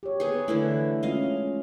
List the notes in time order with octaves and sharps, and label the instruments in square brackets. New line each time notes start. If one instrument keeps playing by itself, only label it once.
[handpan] G4 C#5
[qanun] B3 G#4
[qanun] D3 E3 E4 [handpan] A3
[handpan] G#3 C#4 F4 [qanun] D#5 F5